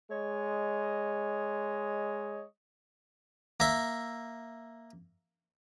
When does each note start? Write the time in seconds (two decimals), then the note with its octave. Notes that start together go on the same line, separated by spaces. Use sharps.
0.11 G#3 C#5 D#5
3.60 A#3 E5